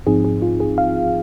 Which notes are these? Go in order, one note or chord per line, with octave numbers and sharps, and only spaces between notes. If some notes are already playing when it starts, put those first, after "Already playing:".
G#2 F3 C4 D#4 G#4
G#4
F4
G#4
F5